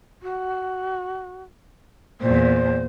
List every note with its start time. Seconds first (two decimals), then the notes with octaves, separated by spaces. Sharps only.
0.22 F#4
2.21 E2 A#2 C5